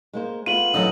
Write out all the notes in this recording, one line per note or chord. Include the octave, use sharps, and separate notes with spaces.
G#3 A#3 C5
G#3 A3 B3 F4 D#7 F#7
F#2 A2 D3 E3 D#5